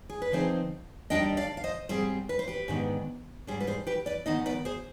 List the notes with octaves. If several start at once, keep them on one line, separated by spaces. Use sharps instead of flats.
G#4
B4
D3 F3 C4 D#4 G#4 C5
D#2 D#3 G3 D4 D#5 G5
D5 F5
F5
C5 D#5
G#2 G3 C4 G#4 C5
B4
C5
G4 B4
G#2 D#3 B3 D4
G#2 G3 D4 G#4 C5
B4
G#4 C5
G4 B4
B4 D5
G#2 D#3 B3 D#4 C5 D#5
B4 D5
G#4 C5